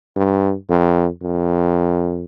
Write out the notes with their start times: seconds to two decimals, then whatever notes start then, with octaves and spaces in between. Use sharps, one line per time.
0.16 G2
0.70 F2
1.23 F2